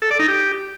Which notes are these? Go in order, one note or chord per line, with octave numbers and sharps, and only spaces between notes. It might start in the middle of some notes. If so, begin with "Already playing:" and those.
A4
D5
D#4
G4